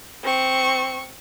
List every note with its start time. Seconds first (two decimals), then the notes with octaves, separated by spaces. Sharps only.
0.24 C4 C#6